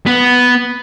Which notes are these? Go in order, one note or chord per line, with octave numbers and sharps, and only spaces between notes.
B3